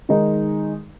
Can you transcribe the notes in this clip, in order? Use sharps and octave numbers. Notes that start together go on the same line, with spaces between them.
D#3 G#3 D#4